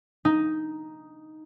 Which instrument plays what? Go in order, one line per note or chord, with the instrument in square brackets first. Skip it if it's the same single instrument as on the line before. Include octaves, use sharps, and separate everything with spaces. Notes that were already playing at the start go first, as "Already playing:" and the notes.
[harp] D#4